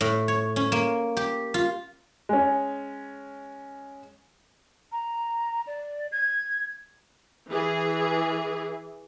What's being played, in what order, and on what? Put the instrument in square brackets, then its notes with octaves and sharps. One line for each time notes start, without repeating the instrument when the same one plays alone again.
[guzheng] A2
C#5
C#4
A#3
G4
F4
[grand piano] G#3 C#4
[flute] A#5
D5
G#6
[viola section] E3 G#4